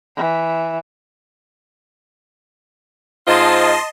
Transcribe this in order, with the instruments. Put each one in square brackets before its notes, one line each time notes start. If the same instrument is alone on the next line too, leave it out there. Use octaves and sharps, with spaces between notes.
[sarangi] E3
[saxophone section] G#2 C4 F4 [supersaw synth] D#5 A5 C6